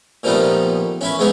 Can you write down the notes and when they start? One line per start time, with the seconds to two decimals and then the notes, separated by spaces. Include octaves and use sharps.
0.23 A#2 F3 G3 A3 B3 D#4
1.01 C#4 E4 B4
1.19 G#2 E3 G#3 B3 D#4 E4